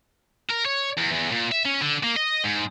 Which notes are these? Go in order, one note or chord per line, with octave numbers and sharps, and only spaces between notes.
A#4
C#5
E2
E2
A#2
E5
C#4
D3
A#3
D#5
G#2